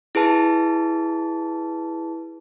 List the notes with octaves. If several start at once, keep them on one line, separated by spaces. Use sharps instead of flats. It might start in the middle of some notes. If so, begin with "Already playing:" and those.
E4 G#4 B4 A5